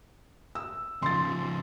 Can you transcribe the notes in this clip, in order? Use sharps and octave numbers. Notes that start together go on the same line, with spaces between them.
E6
C#3 F3 C6 A6